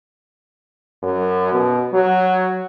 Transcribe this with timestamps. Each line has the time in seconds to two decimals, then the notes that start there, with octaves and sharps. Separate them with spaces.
1.03 F#2
1.53 B2
1.93 F#3